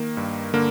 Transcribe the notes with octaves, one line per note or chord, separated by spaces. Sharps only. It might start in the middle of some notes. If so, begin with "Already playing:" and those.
Already playing: D#3 A#3
G2
D3 A#3